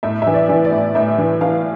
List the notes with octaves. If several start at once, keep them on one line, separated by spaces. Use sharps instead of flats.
A2 E5
E3 E5
D5
E3
D5
A2
A2 E5
E3
E3 F5